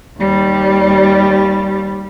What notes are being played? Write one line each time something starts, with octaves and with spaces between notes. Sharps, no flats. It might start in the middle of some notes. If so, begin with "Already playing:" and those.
D#2 G3